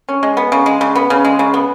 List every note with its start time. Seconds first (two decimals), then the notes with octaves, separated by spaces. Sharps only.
0.09 C#4
0.23 G#3
0.37 B3
0.52 C#3
0.66 G#3
0.81 C#3
0.95 B3
1.10 C#3
1.25 G#3
1.39 C#3
1.54 B3